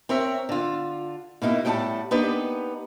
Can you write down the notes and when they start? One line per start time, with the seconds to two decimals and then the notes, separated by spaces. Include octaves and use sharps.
0.09 C4 A#4 C#5 E5
0.49 D3 F4
1.42 B2 A#3 D#4 E4
1.65 A2 G3 G4 G#4 F#5 A5
2.11 A#3 B3 D4 D#4 G4 B4